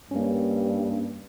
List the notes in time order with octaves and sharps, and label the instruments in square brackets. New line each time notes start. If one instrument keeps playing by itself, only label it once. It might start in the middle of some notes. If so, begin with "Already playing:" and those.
[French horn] G2 [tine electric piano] A#3 C#4